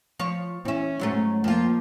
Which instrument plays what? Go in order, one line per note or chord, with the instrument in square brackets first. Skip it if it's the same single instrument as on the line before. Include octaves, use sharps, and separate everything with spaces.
[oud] F3 C#5
[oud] E3 E5 [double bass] C#4
[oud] G#2 F#3 A3
[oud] F2 F4 [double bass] F3 A#3